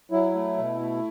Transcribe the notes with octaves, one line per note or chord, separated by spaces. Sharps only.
F#3 E4
A3
B2
A3